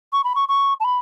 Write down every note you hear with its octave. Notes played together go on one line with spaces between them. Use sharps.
C#6
B5
C#6
C#6
A5
B5